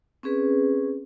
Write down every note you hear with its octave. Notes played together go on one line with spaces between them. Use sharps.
C4 C#4 G#4 B4